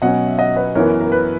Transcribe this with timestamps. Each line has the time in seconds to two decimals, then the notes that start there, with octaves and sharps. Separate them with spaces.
0.02 B2 F#3 C#4 D#5 F#5
0.27 E5
0.39 D#5 F#5
0.56 B4 D#5
0.75 F#2 E3 B3 A#4 C#5
1.01 A#4
1.12 B4